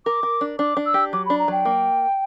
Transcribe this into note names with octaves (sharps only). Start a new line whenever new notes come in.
A#4 D6
A#4
D4
D4 D6
D4
E6
G4
F#3 D6
D4 B5
A#5
F#3 G5
A#3